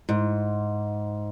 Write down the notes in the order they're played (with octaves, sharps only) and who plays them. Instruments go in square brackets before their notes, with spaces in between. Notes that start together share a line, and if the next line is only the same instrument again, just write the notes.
[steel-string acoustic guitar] G#2